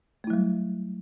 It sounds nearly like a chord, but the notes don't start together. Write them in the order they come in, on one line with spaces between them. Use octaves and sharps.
A3 E4 F#3 G3